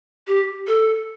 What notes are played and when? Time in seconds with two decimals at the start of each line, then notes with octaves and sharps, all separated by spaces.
0.27 G4
0.67 A4